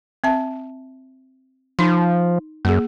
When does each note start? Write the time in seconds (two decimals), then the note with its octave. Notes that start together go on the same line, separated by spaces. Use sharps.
0.24 C4 E5 A5
1.79 F3 D#4 C6
2.65 F#2 A#3 G#4